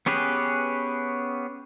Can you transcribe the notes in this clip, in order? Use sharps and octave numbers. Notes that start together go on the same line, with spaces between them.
B3 C#4 G4 G#4 B4